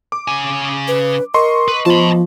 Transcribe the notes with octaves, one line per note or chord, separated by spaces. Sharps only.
D6
C#3 G#5
B4
A#4 D#5 C6 C#6
B4
F3 B3 A5 B5